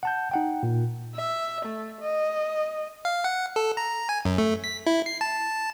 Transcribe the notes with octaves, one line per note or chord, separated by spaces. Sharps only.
F#5 A5 G6
D#4 F#5 G5
A#2
E5
A3
D#5
F5
F#5
A4
A#5
G#5
F#2
A3
B6
E4
C7
A5